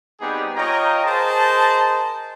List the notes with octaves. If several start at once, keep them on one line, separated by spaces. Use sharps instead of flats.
G3 B3 C4 D#4 G4 G#4
F4 C#5 D#5 G5 A#5
G#4 A#4 C5 D#5 A5